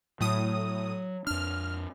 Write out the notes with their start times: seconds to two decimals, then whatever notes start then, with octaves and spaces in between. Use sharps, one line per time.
0.21 A2 F#3 D#6
1.27 F2 D4 F6